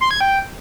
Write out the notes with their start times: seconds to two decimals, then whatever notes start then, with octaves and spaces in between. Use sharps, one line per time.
0.01 C6
0.11 G#6
0.21 G5